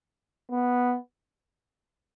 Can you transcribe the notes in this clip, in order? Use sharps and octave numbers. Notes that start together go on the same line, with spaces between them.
B3